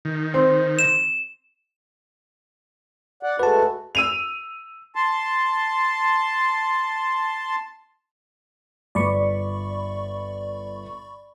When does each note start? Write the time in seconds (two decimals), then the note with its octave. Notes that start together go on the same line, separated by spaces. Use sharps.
0.05 D#3
0.34 C4
0.79 E7
3.23 D5 F#5
3.39 G#3 A3 F#4 B4 A5
3.95 E6 D#7 F7
4.95 A5 C6
8.95 G1 D5 B5 C#6